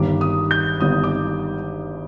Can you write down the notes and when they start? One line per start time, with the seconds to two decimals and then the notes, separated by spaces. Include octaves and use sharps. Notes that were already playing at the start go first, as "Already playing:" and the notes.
Already playing: G1 G2 D#3 D6
0.21 D#6
0.51 G6
0.80 G1 G2 D#3 D#6
1.04 D6